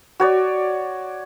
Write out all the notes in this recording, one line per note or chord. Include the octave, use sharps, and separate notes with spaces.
F#4 C#5 D5